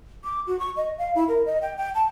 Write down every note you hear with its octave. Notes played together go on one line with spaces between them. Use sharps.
D6
F#4
C#6
D#5
F5
E4
A#4
D#5
G5
G5
A5